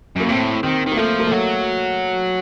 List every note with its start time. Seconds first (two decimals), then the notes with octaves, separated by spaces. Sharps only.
0.16 F#2 A#3
0.28 A2 C4
0.63 D#3 C4
0.86 D#3
0.92 A#3
0.97 F3 A3
1.20 A#3
1.27 A3
1.31 F#3